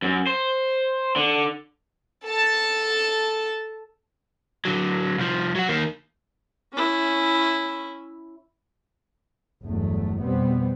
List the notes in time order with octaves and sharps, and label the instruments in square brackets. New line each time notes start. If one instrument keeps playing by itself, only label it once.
[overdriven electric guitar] F#2
C5
D3
[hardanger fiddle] A4 A5
[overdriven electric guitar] D3 F#3
C2 F3
F#3 F#4
D#3 A#3
[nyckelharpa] C#4 E4
[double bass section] G1 E2 F#3 A3
F2 B2 G3 B3 C4